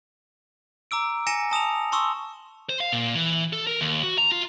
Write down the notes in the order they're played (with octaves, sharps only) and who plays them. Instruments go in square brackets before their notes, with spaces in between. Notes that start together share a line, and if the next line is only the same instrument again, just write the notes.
[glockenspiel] A#5 D6 E6 D7
G#5 A#6 C#7 E7
A5 D#6 E7 F7
A5 C6 C#6 D#6 E6
[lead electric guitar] C5
F5
A#2
E3
A4
A#4
D#2
F#4
A#5
F4